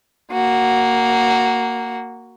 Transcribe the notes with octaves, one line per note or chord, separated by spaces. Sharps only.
A#3 F#4